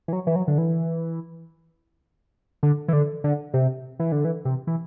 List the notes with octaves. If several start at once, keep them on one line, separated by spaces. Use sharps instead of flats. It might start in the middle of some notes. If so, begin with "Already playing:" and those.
E3
F#3
E3
F#3
D3
E3
D3
E3
D3
D3
C3
E3
D3
E3
C3
E3